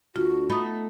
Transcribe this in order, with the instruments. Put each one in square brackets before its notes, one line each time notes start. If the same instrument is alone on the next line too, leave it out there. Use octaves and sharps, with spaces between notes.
[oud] D2 [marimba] F4 [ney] F#4
[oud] A3 B3 D#4 [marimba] B5 D#6